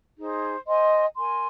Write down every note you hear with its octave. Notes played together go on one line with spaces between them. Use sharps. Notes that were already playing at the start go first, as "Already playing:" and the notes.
D#4 G#4 C5
C5 D#5 G#5 C6
A#4 G#5 C6